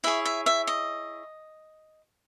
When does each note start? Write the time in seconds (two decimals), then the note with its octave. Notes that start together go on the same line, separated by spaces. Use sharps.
0.04 E4 G#4 C#5 E5
0.25 E5
0.46 E5
0.67 D#5